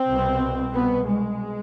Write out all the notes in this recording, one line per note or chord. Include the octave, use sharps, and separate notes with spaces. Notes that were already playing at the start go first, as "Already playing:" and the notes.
Already playing: C4
C2 B2
C2 B2 B3
G#3